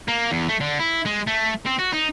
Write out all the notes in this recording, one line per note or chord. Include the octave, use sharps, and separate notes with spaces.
A#3
E2
A3
D3
E4
G#3
A3
C4
F#4
D#4